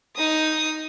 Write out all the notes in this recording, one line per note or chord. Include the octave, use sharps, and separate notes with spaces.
D#4 D#6